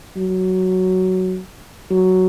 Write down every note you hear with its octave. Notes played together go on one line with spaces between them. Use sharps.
F#3
F#3